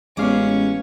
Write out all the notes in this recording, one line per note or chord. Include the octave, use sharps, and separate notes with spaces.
A1 G#3 B3 C#4 F5 D6